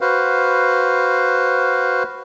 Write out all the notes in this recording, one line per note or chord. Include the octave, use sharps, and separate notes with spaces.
F#4 B4 C5 F5